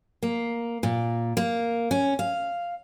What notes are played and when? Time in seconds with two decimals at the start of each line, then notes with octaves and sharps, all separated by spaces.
0.22 A#3
0.83 A#2
1.37 A#3
1.91 C#4
2.19 F5